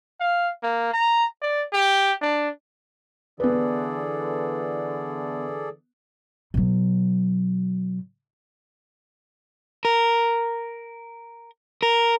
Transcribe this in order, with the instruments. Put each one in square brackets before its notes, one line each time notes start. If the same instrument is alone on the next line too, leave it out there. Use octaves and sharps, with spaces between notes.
[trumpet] F5
A#3
A#5
D5
G4
D4
[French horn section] D3 E3 [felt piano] B3 B4 [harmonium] G#4 A4 D5
[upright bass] B2 F#3
[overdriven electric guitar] A#4
A#4